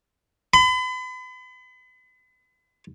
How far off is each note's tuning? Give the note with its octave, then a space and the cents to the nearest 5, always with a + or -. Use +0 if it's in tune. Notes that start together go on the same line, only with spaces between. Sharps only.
B5 +40